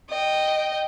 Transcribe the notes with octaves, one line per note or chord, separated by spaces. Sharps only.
D#5 G5